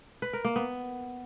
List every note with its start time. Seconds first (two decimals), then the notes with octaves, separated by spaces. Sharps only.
0.22 B4
0.33 A#4
0.45 A#3
0.56 B3